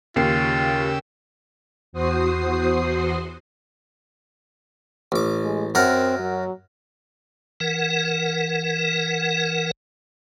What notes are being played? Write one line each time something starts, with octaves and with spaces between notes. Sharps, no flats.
D#2 C#3 F4 G4 E6 C7
E2 F#4 C5 D#6 C7
A1 D6
G#3
F#2 C4 A#4 F#5
F#3
E3 A#4 F#5